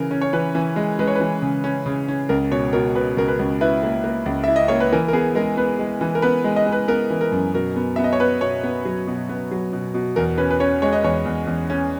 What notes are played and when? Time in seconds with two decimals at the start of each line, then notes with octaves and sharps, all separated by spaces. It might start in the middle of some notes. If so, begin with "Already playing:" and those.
Already playing: C#3 E3 A#4
0.11 C#4
0.21 C#5
0.33 E3 B4
0.55 E3
0.76 G#3
0.99 G#3 B4
1.07 C#5
1.16 E3 B4
1.42 C#3
1.64 C#4
1.86 C#3
2.08 C#4
2.29 C#2 A#4
2.51 B2 C#5
2.73 B2 A#4
2.95 B2 B4
3.17 C#2 A#4
3.28 B4
3.39 C#2
3.61 E4 B4
3.83 A#3
4.04 A#3
4.26 C#2
4.44 E4 E5
4.56 D#5
4.68 A#3 C#5
4.80 B4
4.93 E3 A#4
5.08 A#4
5.13 B3 G#4
5.35 G#3 A#4
5.57 B3 B4
5.79 G#3
6.01 E3
6.15 A#4
6.22 B3 B4
6.44 G#3
6.56 D#5
6.67 G#3
6.72 B4
6.88 B3 A#4
7.10 E3
7.21 A#4
7.32 F#2
7.54 B2 A#4
7.76 B3
7.96 B3 E5
8.04 D#5
8.13 C#5
8.20 B3 B4
8.41 B2 C#5
8.64 B3
8.85 F#3
9.07 B2
9.29 B3
9.51 F#3
9.73 B2
9.94 B2
10.16 E2 A#4
10.38 C#4 B4
10.51 B4
10.60 C#4 C#5
10.82 G#3 C#5
10.93 D#5
11.04 E2 C#5
11.26 E2
11.47 E2
11.70 C#4